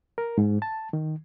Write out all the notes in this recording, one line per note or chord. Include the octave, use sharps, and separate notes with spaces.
A#4
G#2
A5
D#3